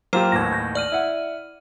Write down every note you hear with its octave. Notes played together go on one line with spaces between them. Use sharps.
F#3 A#3 F4 G4 C5 F6
A1 D#2 A2 G#6 A#6
G6 A#6
D5 F6 D#7
E4 F#5